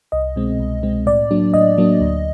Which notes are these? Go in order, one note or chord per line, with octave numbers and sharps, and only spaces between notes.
C2 D#5
B2 G#3 C4
C2
B2 G#3 C4
A2 D5
F#3 A#3 D4
A2 D#5
F#3 A#3 D4
D2